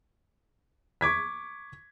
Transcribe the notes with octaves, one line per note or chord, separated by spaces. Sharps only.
C#6 D6 G#6 B6